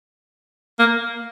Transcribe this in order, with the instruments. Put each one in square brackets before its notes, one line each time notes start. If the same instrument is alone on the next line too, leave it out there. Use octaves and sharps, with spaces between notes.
[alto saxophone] A#3